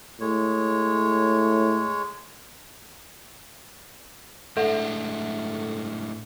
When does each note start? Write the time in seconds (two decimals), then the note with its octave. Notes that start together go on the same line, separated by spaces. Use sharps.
0.21 A2 G#3 C#5
4.57 A2 G#3 D4 A4 E5 F#5